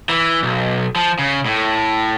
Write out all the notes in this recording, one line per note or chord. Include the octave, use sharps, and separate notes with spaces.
E3
B1
F3
C#3
A2